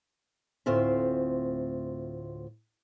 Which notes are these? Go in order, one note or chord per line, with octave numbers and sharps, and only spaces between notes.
D2 A2 C4 F4 E5